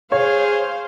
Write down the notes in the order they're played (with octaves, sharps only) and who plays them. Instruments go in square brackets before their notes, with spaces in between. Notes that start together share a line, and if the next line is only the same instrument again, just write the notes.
[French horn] G#4 [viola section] C5 F5 [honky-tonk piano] C#5